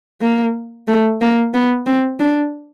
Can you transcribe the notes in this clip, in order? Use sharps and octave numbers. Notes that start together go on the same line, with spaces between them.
A#3
A3
A#3
B3
C4
D4